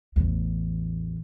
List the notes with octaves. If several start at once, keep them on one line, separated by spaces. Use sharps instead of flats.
A1 E2